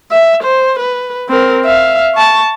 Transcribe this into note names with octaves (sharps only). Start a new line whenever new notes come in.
E5
C5
B4
C4 A#4
E5 F5
A5 C#6